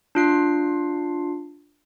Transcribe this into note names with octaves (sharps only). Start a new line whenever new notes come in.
D4 F4 C7